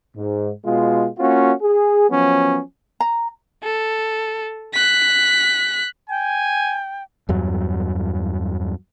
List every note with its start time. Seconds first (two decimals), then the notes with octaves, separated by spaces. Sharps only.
0.16 G#2
0.65 B2 G#3 F4
1.19 A#3 C#4 F4 F#4
1.61 G#4
2.10 F3 F#3 B3 C#4
3.00 A#5
3.63 A4
4.74 F#6 B6
6.10 G5 G#5
7.29 E2 G2 F#3